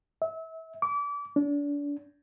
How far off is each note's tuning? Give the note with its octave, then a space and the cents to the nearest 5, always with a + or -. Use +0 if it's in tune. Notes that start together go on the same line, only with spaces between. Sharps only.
E5 -30
D6 -30
D4 -30